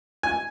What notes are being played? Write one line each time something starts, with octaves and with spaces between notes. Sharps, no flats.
G#5